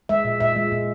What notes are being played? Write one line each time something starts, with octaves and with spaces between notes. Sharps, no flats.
G#3 E5
A#2
A#2 E5
G#3
A#2